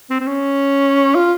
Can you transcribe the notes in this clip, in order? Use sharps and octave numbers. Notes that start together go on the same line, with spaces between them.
C4
C4
C#4
F4